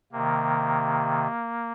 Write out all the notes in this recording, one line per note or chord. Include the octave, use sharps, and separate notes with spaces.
C3 D#3 A#3